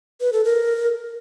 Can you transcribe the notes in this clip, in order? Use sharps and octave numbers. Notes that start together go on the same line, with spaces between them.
B4
A4
A#4